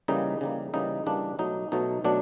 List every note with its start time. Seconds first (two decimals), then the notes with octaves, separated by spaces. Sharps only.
0.08 C#3 E3 G3 A#3 D#4
0.41 C#3 E3 G3 A#3
0.74 C#3 E3 G3 A#3 D#4
1.06 C#3 E3 G3 A#3 D4
1.39 B2 F#3 A3 D#4
1.72 B2 F#3 A3 D#4
2.04 B2 F#3 A3 D4